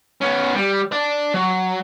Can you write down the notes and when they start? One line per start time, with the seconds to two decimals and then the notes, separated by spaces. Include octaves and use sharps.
0.21 B3 C#4
0.56 G3
0.92 D5 A5
1.34 F#3